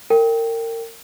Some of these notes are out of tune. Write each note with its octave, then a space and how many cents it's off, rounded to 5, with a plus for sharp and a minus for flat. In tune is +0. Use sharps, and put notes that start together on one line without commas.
A#4 -30 G5 +0